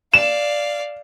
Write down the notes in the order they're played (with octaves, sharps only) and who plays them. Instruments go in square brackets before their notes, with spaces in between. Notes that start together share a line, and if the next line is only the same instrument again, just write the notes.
[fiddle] D5 F5 [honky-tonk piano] E7